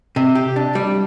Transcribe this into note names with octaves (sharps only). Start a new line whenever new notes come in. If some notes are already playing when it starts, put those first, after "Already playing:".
C3
G4
D4
G3